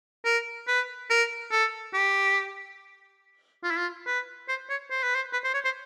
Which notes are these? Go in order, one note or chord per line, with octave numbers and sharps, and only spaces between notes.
A#4
B4
A#4
A4
G4
F4
E4
F4
B4
C5
C#5
C5
B4
C5
B4
C5
C#5
C5